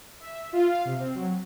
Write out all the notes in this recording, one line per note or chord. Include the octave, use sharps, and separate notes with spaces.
E5
F4
F5
C3
C4
F#3